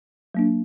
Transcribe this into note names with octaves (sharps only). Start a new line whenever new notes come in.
F#3 A#3 D4